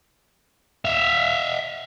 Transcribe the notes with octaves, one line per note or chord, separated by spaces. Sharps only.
E5 F5